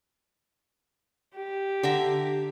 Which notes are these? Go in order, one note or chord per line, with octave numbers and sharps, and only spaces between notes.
G4
D3 E5 A#5